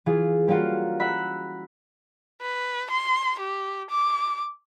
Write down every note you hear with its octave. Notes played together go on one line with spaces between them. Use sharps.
E3 F4 G#4
G3 A#3 C#4 F4 F#4
E5 F#5 A#5 B5 F#6 B6
B4
C6
G4
D6